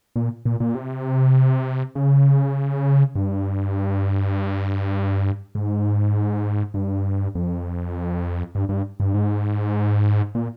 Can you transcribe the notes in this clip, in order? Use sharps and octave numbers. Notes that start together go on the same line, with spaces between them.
A#2
A#2
A#2
C3
C#3
G2
G#2
G2
F2
G2
G2
G2
G#2
A#2